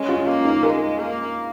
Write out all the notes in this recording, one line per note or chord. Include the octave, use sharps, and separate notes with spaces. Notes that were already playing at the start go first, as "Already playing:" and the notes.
Already playing: G#3 C#4
F4
A#3
D#4
G#3 A#4
A#3